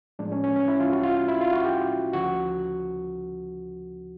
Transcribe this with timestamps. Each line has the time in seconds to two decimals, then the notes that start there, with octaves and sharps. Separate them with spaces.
0.19 A2 F3 G#3 D4
0.32 C#4
0.44 C#4
0.56 C#4
0.68 E4
0.80 F4
0.92 F#4
1.04 F4
1.28 E4
1.41 F4
1.53 F#4
1.65 G4
2.13 D2 C#3 F3 F#4